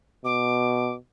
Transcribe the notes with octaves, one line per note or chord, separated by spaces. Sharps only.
B2 D6